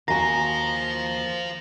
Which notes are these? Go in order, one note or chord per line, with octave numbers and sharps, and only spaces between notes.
D#2 F#4 C5 F5 G#5 A#5 A#6